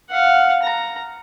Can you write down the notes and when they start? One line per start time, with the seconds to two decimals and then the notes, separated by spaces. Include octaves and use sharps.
0.11 F5 F#5
0.63 A#5